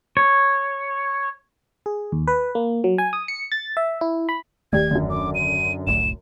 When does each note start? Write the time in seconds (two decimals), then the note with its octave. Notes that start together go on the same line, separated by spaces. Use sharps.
0.17 C#5
1.86 G#4
2.12 D#2
2.28 B4
2.55 A#3
2.84 F#3
2.98 G#5
3.13 D#6
3.28 C#7
3.52 A6
3.77 E5
4.01 E4
4.29 B5
4.73 D#1 D#3 A3 G4 D5 G#6
4.91 F#2 D3
5.10 D6
5.35 D#7
5.87 F1 C2 A2 E7